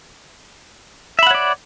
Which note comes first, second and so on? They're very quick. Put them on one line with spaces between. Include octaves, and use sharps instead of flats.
E5 B5 F#5 C#5 D5